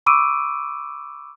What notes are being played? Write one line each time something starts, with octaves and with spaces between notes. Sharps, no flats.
B5 C#6 D6 E6 D7 D#7